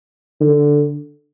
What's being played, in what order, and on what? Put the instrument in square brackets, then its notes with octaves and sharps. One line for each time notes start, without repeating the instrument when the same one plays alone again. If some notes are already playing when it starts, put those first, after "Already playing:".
[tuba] D3